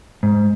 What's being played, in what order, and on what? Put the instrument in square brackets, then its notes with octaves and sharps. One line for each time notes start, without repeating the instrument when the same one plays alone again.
[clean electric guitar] G#2